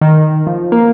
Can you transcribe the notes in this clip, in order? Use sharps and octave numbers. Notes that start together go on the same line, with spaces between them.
D#3
F3
A#3